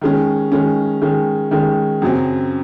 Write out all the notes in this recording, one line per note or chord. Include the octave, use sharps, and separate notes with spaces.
D#3 G#3 C#4
D#3 G#3 C#4
D#3 G#3 C#4
D#3 G#3 C#4
F#2 C#3 F#3 C4